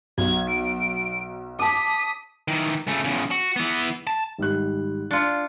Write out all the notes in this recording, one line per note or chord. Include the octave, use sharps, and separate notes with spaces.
B1 G#6
D7
A5 D6 D#6 B6
D#3 E3
C#3 A3
E2 C#3
F#4
E3 B3
A5
G#1 G3 F#6
D4 F4 C#7